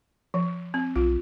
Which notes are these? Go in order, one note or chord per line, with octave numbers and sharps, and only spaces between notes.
F3
C4
B1 F4